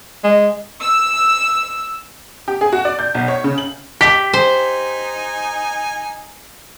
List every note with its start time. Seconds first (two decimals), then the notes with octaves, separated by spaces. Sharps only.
0.24 G#3
0.80 E6
2.48 G4
2.61 G#4
2.72 F#4
2.85 D5
2.99 G6
3.14 B1
3.28 C#5
3.44 C#3
3.58 F#7
4.01 G4 B6
4.33 D#4 C5 G#5